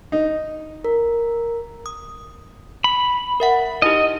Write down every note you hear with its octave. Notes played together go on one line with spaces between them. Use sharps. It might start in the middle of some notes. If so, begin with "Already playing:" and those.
D#4
A#4
D#6
B5
A#4 E5 F#5
D#4 E4 G4 D#5